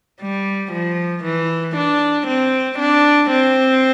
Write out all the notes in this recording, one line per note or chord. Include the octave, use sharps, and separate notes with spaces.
G3
F3
E3
D4
C4
D4
C4